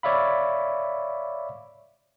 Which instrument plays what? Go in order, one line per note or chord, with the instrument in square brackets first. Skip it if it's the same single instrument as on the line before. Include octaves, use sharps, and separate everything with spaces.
[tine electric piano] C#5 D5 E5 F5 B5